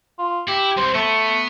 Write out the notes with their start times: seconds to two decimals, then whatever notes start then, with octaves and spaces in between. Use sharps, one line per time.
0.19 F4
0.48 E4 G4
0.77 C2 C5
0.94 A3 B3